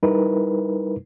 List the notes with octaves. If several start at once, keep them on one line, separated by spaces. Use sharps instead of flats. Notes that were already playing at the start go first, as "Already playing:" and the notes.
G3 D#4 E4 A#4 B4